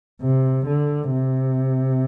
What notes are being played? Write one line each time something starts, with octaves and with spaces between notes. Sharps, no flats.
C3
D3
C3